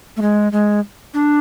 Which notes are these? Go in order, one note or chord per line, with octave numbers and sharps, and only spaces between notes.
A3
G#3
G#3
D4